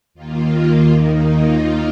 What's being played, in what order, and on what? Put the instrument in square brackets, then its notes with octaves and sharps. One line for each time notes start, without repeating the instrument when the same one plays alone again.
[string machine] D#2 D#3 A#3 F4
D#2 D#3 A#3 D#4
F4